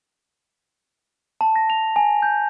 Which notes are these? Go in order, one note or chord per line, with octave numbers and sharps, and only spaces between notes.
A5
A#6
F7
G#5
G6